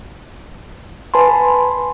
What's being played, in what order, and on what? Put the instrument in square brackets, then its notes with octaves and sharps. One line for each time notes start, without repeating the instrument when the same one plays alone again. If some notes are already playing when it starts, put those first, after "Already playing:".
[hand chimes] B4 G#5 A5 B5 C6